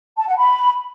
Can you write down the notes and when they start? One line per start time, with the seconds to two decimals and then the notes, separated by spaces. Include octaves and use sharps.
0.17 A5
0.27 F#5
0.37 B5